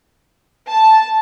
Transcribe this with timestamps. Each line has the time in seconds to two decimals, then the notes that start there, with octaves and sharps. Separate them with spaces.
0.68 A5